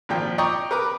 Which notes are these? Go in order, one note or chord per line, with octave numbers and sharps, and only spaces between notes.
G#1 A#2 F3 G5
D5 D#5 G5 A#5 C#6 D#6
A#4 B4 D6